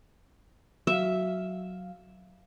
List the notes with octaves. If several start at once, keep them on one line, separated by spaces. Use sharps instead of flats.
F#3 F#4 E5 F5